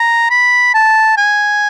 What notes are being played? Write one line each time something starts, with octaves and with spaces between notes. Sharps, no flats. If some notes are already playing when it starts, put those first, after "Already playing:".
Already playing: A#5
B5
A5
G#5